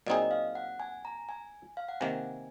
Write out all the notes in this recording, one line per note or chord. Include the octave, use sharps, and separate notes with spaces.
A#2 F#3 C4 D#4 G#4 D#5
F5
F#5
G#5
A#5
G#5
F5
F#5
C3 D#3 A#3 G#5